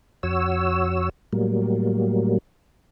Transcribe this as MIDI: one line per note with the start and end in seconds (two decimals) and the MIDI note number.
0.23 1.09 41
0.23 1.09 66
0.23 1.09 73
0.23 1.09 88
1.33 2.38 45
1.33 2.38 54
1.33 2.38 55
1.33 2.38 58